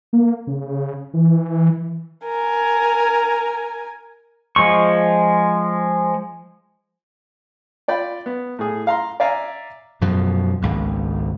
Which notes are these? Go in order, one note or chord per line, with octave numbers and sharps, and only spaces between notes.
A#3
C#3
E3
A#4 G#5
F3 G#3 C#6
F4 D5 G5 B5
B3
A2 G#4
F5 A#5 C6
D5 E5 F5 G#5 A#5
F#2 B2 F3
G#1 C#2 G#2